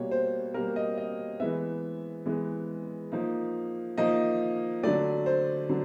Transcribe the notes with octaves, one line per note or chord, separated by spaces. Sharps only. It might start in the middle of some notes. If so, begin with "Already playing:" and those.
Already playing: B2 G3 A#3 C#5
C5
B2 G3 A#3 A#4
D#5
D#5
E3 G#3 B3 E5
E3 G#3 B3
F3 A#3 D#4
F3 A#3 D#4 D#5
D3 F#3 A3 D5
C5
D3 F#3